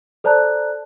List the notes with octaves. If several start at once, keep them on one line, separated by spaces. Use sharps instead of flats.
A4 C5 D5 A5 A#5 F#6